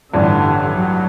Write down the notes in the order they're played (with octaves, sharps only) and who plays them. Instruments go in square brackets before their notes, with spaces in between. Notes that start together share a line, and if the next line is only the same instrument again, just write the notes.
[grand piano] A1 G2 E3 G3 [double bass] D3
[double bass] F#3